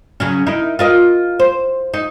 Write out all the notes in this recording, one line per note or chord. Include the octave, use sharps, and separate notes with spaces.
C#3 F#3 C#4
D#4 E4 A#4
F4 A#4 D#5
C5
D#4